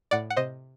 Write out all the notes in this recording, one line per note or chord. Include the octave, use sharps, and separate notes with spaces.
A2 D5 F#5
F#5
C3 C5 D#5